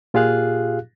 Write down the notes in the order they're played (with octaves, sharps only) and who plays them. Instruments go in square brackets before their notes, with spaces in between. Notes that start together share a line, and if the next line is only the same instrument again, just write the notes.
[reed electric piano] A#2 F4 G4 G#4 F5 F#6